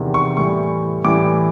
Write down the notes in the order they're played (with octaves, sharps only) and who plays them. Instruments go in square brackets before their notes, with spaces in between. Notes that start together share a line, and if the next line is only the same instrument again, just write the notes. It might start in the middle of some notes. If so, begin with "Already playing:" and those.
Already playing: [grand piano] E2 C3 D#3
C#6
A2 E3 G3 C#6
A2 E3 G3 D6